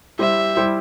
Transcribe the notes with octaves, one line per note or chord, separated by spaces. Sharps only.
G3 E4 G4 C5 E5
G3 E4 G4 C5